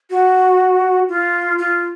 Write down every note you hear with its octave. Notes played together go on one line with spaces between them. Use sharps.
F#4
F4
F4